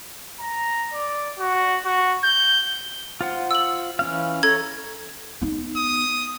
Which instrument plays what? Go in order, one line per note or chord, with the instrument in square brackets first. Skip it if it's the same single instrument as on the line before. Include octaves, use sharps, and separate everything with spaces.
[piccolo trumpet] A#5
D5
F#4
F#4
G6
[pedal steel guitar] F4 C5 F#5
[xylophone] E6 F#7
[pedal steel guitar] E3 C#4 F5
[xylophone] A4 G#6 [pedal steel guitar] C#5 A#5
[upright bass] B3 D#4
[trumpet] D#6